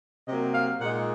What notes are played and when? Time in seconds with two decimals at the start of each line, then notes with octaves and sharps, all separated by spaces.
0.28 C3 F#3 A#3 D#5
0.54 F5
0.81 A#2 G#3 D#4 F#5